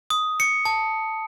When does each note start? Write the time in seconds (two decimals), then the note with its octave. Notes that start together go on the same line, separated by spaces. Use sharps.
0.10 D#6
0.40 C#7
0.65 A5